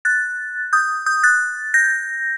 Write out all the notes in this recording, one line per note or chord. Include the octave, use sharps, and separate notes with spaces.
F#6 A6
D#6 G6
D#6 G6
F#6 A6
G6 A#6